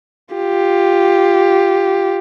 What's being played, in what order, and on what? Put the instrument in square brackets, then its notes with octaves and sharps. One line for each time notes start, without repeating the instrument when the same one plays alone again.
[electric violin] F4 G4